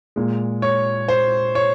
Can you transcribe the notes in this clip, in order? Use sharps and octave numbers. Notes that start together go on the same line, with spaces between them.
A#2 G#3
C#5
C5
C#5